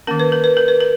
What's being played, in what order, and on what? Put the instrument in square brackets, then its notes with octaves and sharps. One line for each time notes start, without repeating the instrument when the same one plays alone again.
[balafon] D#3 A#3 C#4 A#4
B4
A#4
B4
A#4
B4
A#4